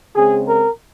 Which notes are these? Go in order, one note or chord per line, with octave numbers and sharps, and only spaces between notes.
C#3 G#3 C4 G#4
A#4